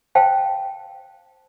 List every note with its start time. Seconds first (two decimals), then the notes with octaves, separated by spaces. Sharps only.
0.15 C5 F5 G5 A5